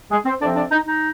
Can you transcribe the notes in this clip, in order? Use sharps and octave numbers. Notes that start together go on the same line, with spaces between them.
G#3 G#4
C4 C5
F2 C3 F3 C4 D4 D5
D4 D5
D#4
D#4